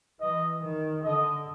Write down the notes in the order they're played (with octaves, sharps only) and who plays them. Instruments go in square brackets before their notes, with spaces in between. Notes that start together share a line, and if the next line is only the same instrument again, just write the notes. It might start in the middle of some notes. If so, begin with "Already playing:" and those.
[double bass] E3 [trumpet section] D#5
[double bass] D#3
[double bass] D3 [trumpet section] D#5